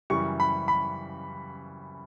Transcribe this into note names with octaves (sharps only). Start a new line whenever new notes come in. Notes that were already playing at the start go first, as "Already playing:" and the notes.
F#2 C#3 E3 G3 C#6
B5
B5